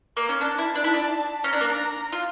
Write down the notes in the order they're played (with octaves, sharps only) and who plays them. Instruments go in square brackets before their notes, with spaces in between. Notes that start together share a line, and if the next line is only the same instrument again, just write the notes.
[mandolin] A#3
C#4
[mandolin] D4 [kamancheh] A5
[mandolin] E4
D4
E4
D4
[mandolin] C#4 [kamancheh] A#5
[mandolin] D4
A#3
D4
F4